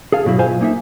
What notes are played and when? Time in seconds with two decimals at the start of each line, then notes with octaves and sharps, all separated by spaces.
0.12 G#4 A4 F5
0.25 G2 B2 F#3 E4
0.39 B1 F4 C5 F5 G#5
0.61 A#3 D#4 E5